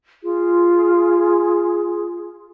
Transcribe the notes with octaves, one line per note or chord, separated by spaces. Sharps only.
F4 G#4